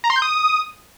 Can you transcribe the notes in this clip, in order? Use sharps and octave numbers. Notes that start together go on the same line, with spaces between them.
A#5
C6
G6
D#6